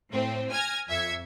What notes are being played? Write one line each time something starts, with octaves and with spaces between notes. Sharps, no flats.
A2 C4
G#5 F6 G#6 A#6
F2 E5 G#6 C#7